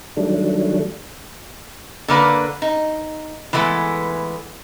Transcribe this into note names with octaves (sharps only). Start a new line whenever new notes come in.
D#3 F#3 G3 A3 D4
D3 A#3 B4
D#4
E3 G#3 A3 B3